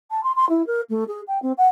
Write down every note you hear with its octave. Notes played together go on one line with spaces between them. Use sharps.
A5
C6
C6
E4
A#4
A3
G#4
G5
C4
F#5